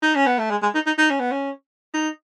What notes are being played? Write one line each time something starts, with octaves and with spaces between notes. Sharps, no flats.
D#4
C#4
B3
A3
G#3
G#3
D#4
D#4
D#4
C#4
B3
C#4
D#4